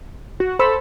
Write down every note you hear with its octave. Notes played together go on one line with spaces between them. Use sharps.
F#4
A4 C5 B5 E6